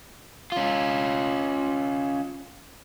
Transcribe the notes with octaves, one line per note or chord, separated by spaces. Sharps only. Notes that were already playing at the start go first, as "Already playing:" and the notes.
C#4 F4